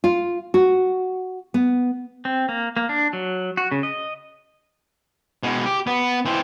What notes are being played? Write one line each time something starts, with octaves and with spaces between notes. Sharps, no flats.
F4
F#4
B3
C4
A#3
A#3
D4
F#3
F#4
C#3
D#5
B2 G#3
G4
B3
E3 C4